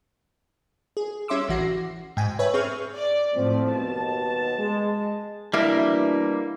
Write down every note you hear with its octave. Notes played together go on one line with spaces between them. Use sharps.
G#4
G3 C#4 E5 C6 D6 E6
A1 E3 F#4 A#6 C7
G#2 G5 G#5
B4 C#5 E5 G#5
C4 G#4 C#6 F6
D5
A2 F3 C4
D#2 B2 A5
G#3
B2 E3 G3 A#3 D4 E4 D#5 E5